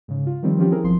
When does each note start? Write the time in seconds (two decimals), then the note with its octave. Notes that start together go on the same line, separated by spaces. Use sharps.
0.08 G#2 C#3
0.26 F4
0.43 D#3 F3 G3 C4
0.58 E3 F3 C#4 F4 G4
0.71 C4 E4 G#4 A#4
0.84 G1 F3 C6